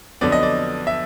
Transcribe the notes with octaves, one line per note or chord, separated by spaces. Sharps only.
F2 D3 F#3 B3 D5
D#5
D5
E5